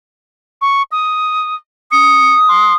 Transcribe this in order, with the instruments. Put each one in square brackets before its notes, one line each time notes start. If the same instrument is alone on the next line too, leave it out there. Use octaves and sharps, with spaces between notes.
[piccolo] C#6
D#6
[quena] D#6 [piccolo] C#7
[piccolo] C6